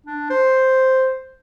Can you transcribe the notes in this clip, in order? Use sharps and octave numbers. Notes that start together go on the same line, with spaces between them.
D4
C5